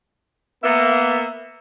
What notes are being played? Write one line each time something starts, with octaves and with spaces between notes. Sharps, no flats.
A#3 B3 E5